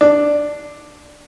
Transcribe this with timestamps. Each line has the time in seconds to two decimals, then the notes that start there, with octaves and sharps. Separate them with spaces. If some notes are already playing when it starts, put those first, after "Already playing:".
0.01 D4